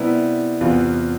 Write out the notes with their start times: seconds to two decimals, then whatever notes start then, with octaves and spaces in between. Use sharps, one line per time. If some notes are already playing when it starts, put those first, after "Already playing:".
Already playing: C3 G3 B3 E4
0.61 E2 C3 E3 B3 F4